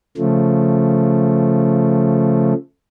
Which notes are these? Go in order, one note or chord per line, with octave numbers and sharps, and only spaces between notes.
C#3 F3 A3